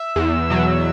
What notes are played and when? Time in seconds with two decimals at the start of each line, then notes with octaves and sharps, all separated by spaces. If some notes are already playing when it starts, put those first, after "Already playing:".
Already playing: E5
0.16 E2
0.50 B2 F#3